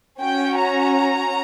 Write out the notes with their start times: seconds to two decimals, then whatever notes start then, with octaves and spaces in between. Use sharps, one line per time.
0.21 C#4 F#4 G5
0.58 A#5